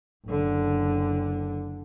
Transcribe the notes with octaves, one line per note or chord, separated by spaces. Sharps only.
F#1 D3